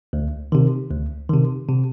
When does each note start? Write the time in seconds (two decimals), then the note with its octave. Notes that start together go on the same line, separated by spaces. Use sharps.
0.13 D2
0.52 C3 D#3
0.91 D2
1.30 C3 D#3
1.69 C3